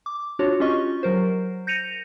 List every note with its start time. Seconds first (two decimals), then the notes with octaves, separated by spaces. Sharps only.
0.06 D6
0.39 D4 F4 F#4 C#5
0.60 C#4 F4 G4 D#5 C#6
1.03 F#3 A#4 C5
1.67 G6 A#6 C#7 D#7 F7